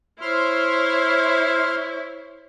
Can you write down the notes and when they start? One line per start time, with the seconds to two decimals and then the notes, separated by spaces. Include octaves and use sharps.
0.21 E4 C5 C#5 C6 F6